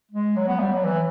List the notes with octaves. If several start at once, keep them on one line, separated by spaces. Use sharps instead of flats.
G#3
F#3
B3
G3
F#3
E3